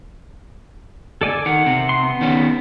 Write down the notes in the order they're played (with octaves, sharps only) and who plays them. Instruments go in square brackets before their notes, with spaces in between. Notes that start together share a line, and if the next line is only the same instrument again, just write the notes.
[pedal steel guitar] A4 D5 G#5
[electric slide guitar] D#3 [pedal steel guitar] F#5
[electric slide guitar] C3
[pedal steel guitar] C6
B3
[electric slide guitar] D#3 C#4